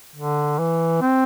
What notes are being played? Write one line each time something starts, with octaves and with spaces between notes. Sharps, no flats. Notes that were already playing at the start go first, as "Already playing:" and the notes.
D3
E3
C4